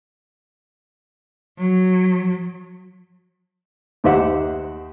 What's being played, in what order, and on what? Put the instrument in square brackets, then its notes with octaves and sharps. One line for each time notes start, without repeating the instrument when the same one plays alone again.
[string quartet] F#3
[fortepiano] D#2 D#4 G4 C5 E5 F#5